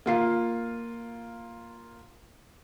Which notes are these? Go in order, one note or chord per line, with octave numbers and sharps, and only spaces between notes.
A#3 F4 C7